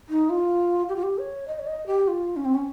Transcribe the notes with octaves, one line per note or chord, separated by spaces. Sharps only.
D#4
F4
G4
F4
G4
C#5
D#5
C#5
D#5
G4
F4
C#4
C4
C#4